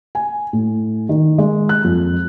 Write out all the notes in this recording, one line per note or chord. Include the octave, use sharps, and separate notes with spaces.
G#5
A2
D#3
G#3
F#6
F2